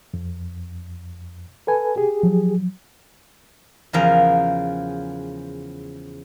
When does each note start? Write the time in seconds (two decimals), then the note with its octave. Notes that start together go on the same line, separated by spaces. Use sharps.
0.14 F2
1.67 A4 B4 G#5
1.96 G4 G#4
2.23 F3 F#3
3.93 E2 C#3 F3 A#4